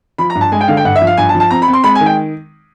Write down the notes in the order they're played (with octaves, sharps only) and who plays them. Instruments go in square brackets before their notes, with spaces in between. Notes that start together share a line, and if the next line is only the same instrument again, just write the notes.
[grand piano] F3 [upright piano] B5
[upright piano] A#5
[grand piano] G2
[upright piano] A5
[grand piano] G#3 [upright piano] G#5
[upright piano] G5
[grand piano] D3 [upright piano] F5
[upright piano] G5
[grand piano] G2 [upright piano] F#5
[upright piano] E5
[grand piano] F3
[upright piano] F5
[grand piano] G2 [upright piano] G#5
[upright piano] A5
[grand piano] F3
[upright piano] A5
[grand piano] C4 [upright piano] A#5
[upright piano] B5
[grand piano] C4
[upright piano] C6
[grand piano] G#3 [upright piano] B5
[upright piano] G#5
[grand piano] D#3
[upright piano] G5